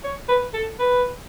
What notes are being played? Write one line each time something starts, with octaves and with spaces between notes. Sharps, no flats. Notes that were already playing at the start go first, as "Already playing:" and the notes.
C#5
B4
A4
B4